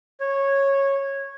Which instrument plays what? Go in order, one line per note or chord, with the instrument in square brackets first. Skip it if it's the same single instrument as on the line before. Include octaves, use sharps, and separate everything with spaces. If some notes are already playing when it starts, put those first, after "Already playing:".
[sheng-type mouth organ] C#5